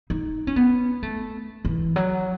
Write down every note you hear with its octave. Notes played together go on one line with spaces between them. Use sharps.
D#4
C#4
B3
A3
E3
F#3